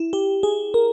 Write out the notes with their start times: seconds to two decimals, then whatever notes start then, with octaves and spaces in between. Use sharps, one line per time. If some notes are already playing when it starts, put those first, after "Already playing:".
Already playing: E4
0.13 G4
0.43 G#4
0.74 A#4